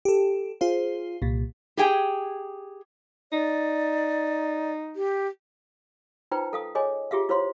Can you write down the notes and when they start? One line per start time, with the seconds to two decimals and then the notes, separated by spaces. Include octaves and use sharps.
0.05 G4 A4
0.61 F4 G#4 C5 F5
1.22 C2 A#2
1.77 G4 G#4 G5
3.32 D#4 D5
4.96 G4
6.31 D#4 F4 B4 C5 G5 A#5
6.53 A4 F5 D#6
6.75 G#4 C#5 D#5 G#5
7.11 F4 G4 G#4 E5 F5
7.29 E4 F4 C5 C#5 F5 C6